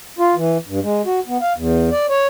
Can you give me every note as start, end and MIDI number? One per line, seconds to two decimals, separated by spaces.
0.19 0.35 65
0.35 0.58 52
0.67 0.80 43
0.83 1.02 56
1.06 1.20 66
1.27 1.38 59
1.41 1.53 77
1.56 1.90 40
1.91 2.06 74
2.09 2.27 73